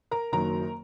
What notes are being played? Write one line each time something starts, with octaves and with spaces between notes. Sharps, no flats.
A#4 A#5
F#1 F#2 D#3 F#3 A#4 A#5